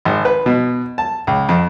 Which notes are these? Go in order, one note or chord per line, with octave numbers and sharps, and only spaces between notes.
G#1
B4
B2
A5
C#2
F2